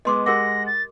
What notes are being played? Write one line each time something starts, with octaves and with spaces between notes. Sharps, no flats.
G#3 B3 D#5 C6 D6
G#3 G4 A#4 F#5 D6 A#6
A6